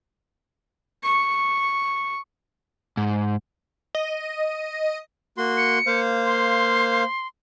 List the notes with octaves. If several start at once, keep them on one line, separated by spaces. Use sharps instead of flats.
C#6
G#2
D#5
A#3 F#4 C6
C#7
A#3 C5 F5
C6